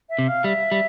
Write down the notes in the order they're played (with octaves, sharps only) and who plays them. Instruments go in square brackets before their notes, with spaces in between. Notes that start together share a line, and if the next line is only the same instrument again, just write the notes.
[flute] E5
[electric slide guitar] C3
[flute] F5
[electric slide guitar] G3 [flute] E5
[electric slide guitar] G3